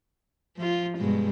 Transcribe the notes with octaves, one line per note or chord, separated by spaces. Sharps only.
F3 F4
G2 B2 G#3